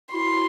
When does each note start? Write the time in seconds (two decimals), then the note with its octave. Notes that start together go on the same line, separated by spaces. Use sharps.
0.13 E4 F#4 C6